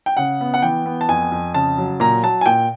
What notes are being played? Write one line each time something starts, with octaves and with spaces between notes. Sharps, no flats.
G5
C#3 F#5
B3
F#5
E3 G5
B3
A5
F2 G#5
F2
C#3 A5
F#3
A#2 A#5
F#3 A5
G#5
A#2 G5